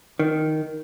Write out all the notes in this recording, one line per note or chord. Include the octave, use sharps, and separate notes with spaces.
D#3